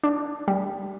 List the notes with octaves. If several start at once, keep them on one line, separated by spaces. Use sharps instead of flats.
D4
G3